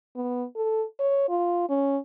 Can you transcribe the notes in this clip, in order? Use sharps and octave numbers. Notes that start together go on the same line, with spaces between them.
B3
A4
C#5
F4
C#4